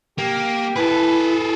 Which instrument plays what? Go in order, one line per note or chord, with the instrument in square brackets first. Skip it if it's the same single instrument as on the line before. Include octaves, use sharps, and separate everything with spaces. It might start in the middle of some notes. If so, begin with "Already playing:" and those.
[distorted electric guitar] A#3 [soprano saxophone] G4
[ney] E4 [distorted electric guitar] G#4 A4 [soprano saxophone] B4